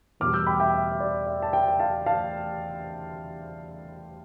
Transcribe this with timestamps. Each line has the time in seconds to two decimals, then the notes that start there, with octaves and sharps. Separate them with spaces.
0.20 E2 B2 G3 D6 F6
0.34 E6 G6
0.47 G5 B5
0.60 E5 G5
0.74 E5
0.92 E5
1.00 D5
1.26 E5
1.42 A5
1.53 E5 G5
1.68 G5
1.79 F5 A5
2.06 F5 A5